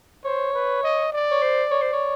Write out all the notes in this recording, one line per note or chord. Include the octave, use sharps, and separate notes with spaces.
C5 C#5
B4
D#5
D5
C#5
C5
C#5
C5
C#5